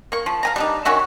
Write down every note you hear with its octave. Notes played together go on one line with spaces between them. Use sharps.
A#3 C#6
F3
F5 G#5 A#5
G3 D4 D#4
D#3 C#4 F#4 E5